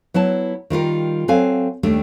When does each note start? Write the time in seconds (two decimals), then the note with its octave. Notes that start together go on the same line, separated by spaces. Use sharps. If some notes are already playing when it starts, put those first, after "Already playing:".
0.14 F#3 B3 E4 A5
0.70 D#3 G3 F4 A#4
1.28 F#3 C4 A4 F5 G#5
1.83 D#2 G3 A3 D4